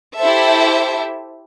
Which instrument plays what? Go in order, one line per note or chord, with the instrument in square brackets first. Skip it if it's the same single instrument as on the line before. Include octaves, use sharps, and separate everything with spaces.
[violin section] E4 G4 A4 C5 E5